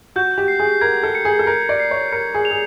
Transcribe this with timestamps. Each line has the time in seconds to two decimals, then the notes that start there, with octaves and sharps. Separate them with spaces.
0.16 F#4 G6
0.38 G4
0.48 C7
0.59 G#4
0.81 A#4 G#6
1.03 A4
1.15 C#7
1.25 G#4
1.39 A4
1.47 A#4 G6
1.69 D5
1.80 C7
1.91 C#5
2.12 A#4 C#7
2.34 G#4
2.45 F7
2.51 G#4